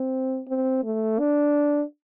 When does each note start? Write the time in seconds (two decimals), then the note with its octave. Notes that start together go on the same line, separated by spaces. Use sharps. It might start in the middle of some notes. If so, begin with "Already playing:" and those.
Already playing: C4
0.48 C4
0.84 A3
1.19 D4